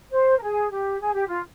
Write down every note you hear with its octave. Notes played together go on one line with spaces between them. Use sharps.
C5
A#4
G#4
G4
G#4
G4
F4